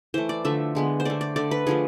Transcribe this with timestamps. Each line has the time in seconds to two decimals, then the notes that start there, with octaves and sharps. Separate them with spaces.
0.14 E3 A3 C5
0.29 D5
0.44 D3 F3 A3 E5
0.75 D3 G#3 B3
1.00 C5
1.05 D3 A3 D5
1.21 D5
1.36 D3 A3 D5
1.51 B4
1.66 D3 F3 A3 G#4